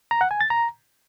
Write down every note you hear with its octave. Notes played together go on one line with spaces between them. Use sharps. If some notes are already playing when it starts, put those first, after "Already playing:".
A#5
F#5
G#5
A6
A#5